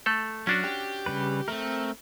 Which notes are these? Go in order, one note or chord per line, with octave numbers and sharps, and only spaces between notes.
A3 A4
F#3 C#4 D4 F#4
G4
C#3 G3 B4
A3 C4 A#4